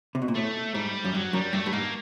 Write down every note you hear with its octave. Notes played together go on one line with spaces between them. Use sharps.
C3
B2
A#2
A2 A3
G#2 G3
F#2
G2 F#3
F#2 G3
G2 A3
G2
G#2 A#3